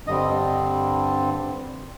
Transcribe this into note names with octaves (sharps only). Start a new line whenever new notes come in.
G2 D3 G3 C4 D#5